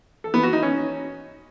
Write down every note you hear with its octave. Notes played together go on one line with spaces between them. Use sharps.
A4
B3
F#4
D#4
C#4